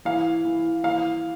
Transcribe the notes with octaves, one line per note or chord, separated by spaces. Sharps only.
E3 F5
E3
E3 F5